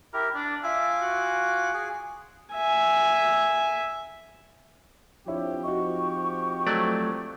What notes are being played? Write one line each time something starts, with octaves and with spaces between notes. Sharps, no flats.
E4 G4 A#4
D4 D5
F4 E5 G#5 D6
F#4
G#4 G#5
E5 G#5
F3 C4 D4 E4 G4 C#5
D#4 F#4 C#6
F#3 A3 D5